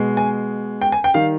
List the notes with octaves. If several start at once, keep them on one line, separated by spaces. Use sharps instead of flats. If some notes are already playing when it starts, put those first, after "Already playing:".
Already playing: B2 G#3
G#5
G5
G#5
G5
D#3 G3 F5